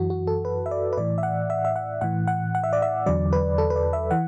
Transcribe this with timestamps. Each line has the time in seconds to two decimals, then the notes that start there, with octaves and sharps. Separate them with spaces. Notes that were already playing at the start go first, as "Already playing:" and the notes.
Already playing: F#2 E3 F#4
0.10 F#4
0.27 A4
0.45 B4
0.66 E5
0.71 D5
0.93 B4
0.98 A2 E3 D5
1.18 E5
1.23 F#5
1.50 E5
1.65 E5
1.76 F#5
2.01 A2 E3 F#5
2.28 F#5
2.55 F#5
2.64 E5
2.73 D5
2.82 E5
3.06 E2 D3 F#3 D5
3.33 B4
3.58 A4
3.70 B4
3.76 D5
3.93 E5
4.11 E3 F#5